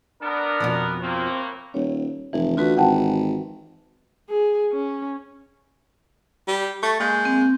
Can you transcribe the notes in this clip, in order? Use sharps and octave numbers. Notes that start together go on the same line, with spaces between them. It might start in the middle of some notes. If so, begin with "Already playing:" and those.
B3 D4 A#4
F2 B2 F3
A2 A#3 C4
D#1 C#5
F1 E3
D2 F4 F#4 B4
G#1 F#5 G5 A5
G#4
C#4
G3
A3 C#6 A6
G#3 A#3 G6
C4